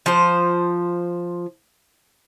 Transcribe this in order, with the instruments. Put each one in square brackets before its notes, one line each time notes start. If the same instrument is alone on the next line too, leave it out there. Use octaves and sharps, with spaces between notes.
[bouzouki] F3 C5